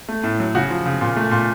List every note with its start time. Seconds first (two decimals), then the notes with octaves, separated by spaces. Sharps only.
0.09 A3
0.24 A2
0.40 F#3
0.55 C#3 F#4
0.70 F3
0.86 C#3
1.01 A#2
1.16 A3
1.31 A#2